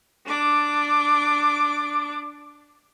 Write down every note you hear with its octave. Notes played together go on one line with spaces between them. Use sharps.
D4 D6